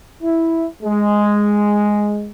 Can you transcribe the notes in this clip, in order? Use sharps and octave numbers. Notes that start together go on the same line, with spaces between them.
E4
G#3